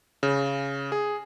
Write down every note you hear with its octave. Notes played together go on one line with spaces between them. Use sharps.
C#3
G#4